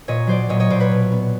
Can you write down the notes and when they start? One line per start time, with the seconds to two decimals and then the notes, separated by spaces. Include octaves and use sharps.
0.08 A#2 C#5 D#5
0.27 F#3 C5 D5
0.49 A#2 C#5 D#5
0.60 C#5 D#5
0.70 A#2 C5 D5
0.80 B4 C#5
0.91 B2
1.12 B3